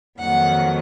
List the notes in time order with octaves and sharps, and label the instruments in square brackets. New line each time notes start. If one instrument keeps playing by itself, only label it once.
[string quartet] F2 D#3 F#3 A#3 F#5